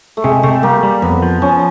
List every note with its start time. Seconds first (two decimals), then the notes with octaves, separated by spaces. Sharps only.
0.17 A3
0.24 C3 G#3
0.43 C3 A3
0.63 G3 A#3
0.83 G3
1.02 F2 B3
1.22 F3
1.42 F3 C#4